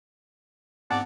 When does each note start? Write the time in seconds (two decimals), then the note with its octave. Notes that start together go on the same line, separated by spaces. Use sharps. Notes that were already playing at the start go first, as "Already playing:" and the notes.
0.91 G#2 B3 C4 D5 F#5 A5